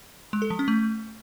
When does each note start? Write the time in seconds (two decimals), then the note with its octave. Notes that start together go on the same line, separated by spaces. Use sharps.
0.33 G#3
0.42 A4
0.50 F3
0.59 C#4
0.68 A3